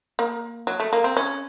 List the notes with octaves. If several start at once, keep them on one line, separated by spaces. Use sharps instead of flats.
A#3
F#3
A3
A#3
C4
C#4